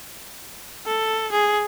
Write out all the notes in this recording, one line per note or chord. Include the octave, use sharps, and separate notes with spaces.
A4
G#4